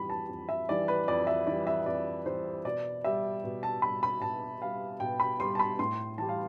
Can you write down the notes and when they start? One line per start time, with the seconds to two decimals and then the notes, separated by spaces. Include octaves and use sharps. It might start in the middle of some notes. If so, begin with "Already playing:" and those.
Already playing: F2 E3 G3 B5
0.10 A5
0.29 F2
0.49 E5
0.69 E3 G3 D5
0.88 B4
1.08 F2 D5
1.27 E5
1.47 E3 G3 D5
1.67 E5
1.86 F2 D5
2.26 E3 G3 C5
2.65 B2 D5
3.04 G3 E5
3.44 B2
3.63 A5
3.82 G3 B5
4.03 B5
4.22 B2 A5
4.61 G3 F5
5.00 B2 G5
5.20 B5
5.40 G3 C6
5.55 A5
5.59 B5
5.79 A2 C6
6.18 E3 G3 A5
6.29 F5